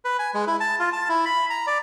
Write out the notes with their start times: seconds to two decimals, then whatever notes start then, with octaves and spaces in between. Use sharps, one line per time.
0.05 B4
0.19 G#5
0.34 G#3
0.47 E4
0.60 A5
0.79 F4
0.93 A5
1.09 E4
1.25 B5
1.50 A#5
1.67 D5